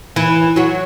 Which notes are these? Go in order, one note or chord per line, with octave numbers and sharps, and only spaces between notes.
E3 E4
F#3 F#4